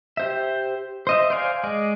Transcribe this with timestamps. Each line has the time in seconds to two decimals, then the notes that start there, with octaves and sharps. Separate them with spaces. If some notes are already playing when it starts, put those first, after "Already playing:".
0.17 G4 C5 E5
1.07 C5 D#5 E5
1.30 C5 D5 F5 G#5
1.63 G#3 G#4 D5 D#5